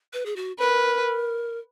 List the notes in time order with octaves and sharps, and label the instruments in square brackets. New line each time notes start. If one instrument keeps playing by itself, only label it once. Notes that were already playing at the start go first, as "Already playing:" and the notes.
[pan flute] B4
G#4
F#4
[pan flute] A#4 [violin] B4